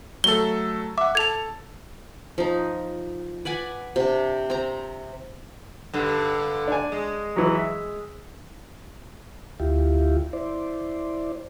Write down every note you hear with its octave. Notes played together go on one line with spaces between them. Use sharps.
F#3 A3 A4 G7
E5 F#5 D6
A4 A5 G#6 F7
F3 D#4
B4 D5 F#5 G#5
C3 D4
C4 A#5
G2 D3
D4 G#5
G#3
E3 F#3
E5
D2 E4 F4 G4
E4 C5 D5